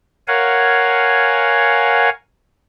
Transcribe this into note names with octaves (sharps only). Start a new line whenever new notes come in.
A#4 C#5 F5 F#5 G#5